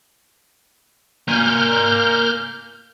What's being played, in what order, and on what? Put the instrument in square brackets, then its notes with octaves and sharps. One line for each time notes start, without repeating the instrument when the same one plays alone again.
[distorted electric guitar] A#3 G#5 [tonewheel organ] F6 G6